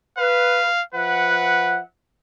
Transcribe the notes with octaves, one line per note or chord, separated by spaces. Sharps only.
B4 F5
F3 B4 E5 F#5